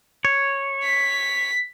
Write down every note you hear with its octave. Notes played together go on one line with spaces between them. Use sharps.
C#5
B6